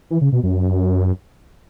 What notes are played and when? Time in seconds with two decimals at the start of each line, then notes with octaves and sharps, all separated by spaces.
0.11 E3
0.21 C#3
0.32 B2
0.43 F#2